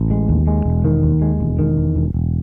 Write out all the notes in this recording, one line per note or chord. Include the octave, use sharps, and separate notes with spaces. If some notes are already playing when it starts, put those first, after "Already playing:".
Already playing: A1
G#3
D#2
G#3
E1
D#3
D#2
G#3
E1
D#3
E2
E1
E1